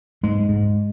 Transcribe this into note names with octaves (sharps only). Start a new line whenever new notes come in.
G#2 G#3
G#2